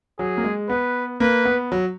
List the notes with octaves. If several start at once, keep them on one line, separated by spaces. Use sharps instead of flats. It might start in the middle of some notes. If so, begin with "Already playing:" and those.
F#3 G#4
A#3
G#3
B3 B4
A#3 B4
B3
F#3